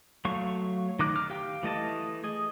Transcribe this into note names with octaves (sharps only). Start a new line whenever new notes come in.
F#3 A3 F5 C#6
D#3 D#4 D6 F#6
D6 F6
G4 F5 G5
E3 A3 D#5 A5
G#4 D#5